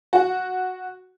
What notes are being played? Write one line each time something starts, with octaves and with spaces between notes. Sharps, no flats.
F#4